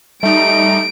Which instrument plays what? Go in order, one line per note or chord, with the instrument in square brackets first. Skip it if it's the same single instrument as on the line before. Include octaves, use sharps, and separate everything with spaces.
[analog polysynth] G3 D#4 [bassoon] A3 [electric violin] D7